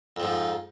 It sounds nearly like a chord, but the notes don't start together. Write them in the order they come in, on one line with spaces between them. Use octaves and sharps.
F2 F3 G#2